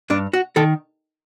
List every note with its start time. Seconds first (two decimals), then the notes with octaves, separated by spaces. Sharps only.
0.10 G2 D4
0.33 F#4
0.56 D#3 A4